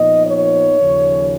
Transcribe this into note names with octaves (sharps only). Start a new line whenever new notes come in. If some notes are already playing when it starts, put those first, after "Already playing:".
Already playing: A#2 F3 B3 D#4 D#5
C#5
D#2 C#3 F3